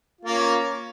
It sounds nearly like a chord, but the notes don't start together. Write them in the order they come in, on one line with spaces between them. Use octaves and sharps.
F4 A#3 C#4